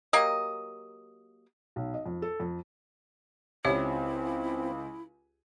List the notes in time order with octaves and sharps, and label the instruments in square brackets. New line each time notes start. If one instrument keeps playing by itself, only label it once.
[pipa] F#3 A#3 G4 D#5
[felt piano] B1
D#5
F2
A4
F2
[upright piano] C#2 [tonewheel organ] C4 [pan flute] E4 [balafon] G4 C#5 E5